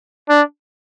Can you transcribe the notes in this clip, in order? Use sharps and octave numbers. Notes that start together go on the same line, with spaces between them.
D4